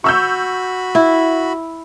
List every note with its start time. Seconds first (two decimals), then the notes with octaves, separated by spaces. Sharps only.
0.04 F#4 B5 C#6 E6 G6
0.95 E4